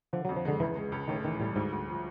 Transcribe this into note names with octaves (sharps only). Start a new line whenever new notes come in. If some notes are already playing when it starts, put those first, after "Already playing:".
D3 F3
F#3
F2
F3
D3 G#3
C#2 E3
G#3
C#2
A2 D#3
D#3 E3
A2 G3
D2 G#2
D2
F3